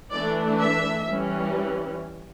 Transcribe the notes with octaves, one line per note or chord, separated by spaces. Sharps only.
E3 A3 D4 D5
E5
E3 G3 C#4